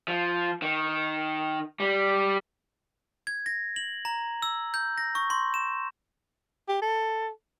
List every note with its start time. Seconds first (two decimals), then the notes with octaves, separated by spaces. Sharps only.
0.08 F3
0.62 D#3
1.80 G3
3.27 G#6
3.46 A#6
3.76 F#7
4.05 A#5
4.42 E6
4.74 G6
4.98 A#6
5.15 C#6
5.30 C6
5.54 E7
6.68 G4
6.82 A4